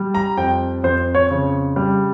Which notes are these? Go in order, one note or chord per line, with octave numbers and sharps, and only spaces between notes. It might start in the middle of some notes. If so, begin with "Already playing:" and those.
Already playing: G3
A#5
F2 G5
F2 C5
C#5
C#3
G3